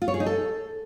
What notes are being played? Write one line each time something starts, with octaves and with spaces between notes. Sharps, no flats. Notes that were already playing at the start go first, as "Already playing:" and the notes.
F4
C#5
G#4
D#4
A4